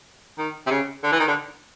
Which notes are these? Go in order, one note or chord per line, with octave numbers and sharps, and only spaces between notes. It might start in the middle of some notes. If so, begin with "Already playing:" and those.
D#3
C3
C#3
D3
E3
D#3
D3